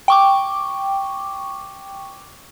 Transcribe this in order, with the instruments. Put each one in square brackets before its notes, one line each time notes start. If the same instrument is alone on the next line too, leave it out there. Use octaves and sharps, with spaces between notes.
[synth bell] G5 C#6 D6